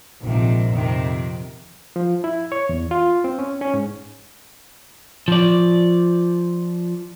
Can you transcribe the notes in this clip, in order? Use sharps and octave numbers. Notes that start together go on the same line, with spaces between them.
A#1 G#2 C3 D#3 F3
F2 C3 D#3
F3
E4
C#5
E2
F4
C4
C#4
C#4
G#2
F3 D5